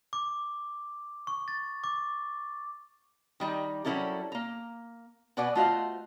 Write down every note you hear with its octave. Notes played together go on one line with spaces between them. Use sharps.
D6
C#6
A6
D6
D#3 G3 D#4
F#3 G3 C#4 E4 A4 A#4
A#3 A#5
B2 F#4 B4 D5 F#5 G#5
A3 F4 F#4 C5 D#5 F5